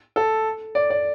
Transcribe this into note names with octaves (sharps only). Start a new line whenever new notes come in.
A4
D5
D5